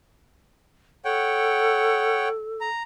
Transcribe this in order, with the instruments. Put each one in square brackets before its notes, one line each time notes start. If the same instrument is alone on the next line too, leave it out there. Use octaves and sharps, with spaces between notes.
[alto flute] A4 [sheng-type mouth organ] C#5 F#5 G5
[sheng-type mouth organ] A#5